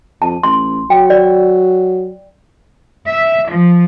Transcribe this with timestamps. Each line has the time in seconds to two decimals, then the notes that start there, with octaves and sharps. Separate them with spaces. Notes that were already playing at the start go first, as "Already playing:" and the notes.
0.22 F2 A5
0.43 A1 C6
0.90 F#3 G5
1.10 D5
3.08 E5
3.50 F3